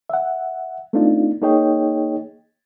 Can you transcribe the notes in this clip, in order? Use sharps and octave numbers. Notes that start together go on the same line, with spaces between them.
E5 F#5
A3 B3 C4 D4 D#4 F4
A#3 D#4 G#4 C#5 D#5 G5